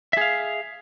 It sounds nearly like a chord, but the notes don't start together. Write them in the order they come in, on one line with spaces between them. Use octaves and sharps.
E5 G#4 F5